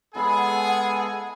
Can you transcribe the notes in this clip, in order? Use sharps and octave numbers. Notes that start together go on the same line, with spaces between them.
G#3 B3 E4 G#4 A4 F#5 G#5 B5